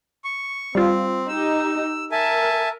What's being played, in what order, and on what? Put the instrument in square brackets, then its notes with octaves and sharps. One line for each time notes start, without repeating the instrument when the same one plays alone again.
[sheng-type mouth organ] C#6
[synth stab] G3 F4 [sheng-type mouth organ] C4
[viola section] D#4 G4 [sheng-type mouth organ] E6
[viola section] A#4 [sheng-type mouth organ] E5 G#5 A5